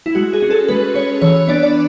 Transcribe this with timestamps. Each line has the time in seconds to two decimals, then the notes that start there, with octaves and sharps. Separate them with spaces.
0.06 E4
0.15 G#3 F#4
0.33 G#4
0.42 C#4
0.50 A4
0.68 G#3 B4
0.94 C#4 C#5
1.22 E3 C#5
1.48 B3 D4 D5
1.63 D5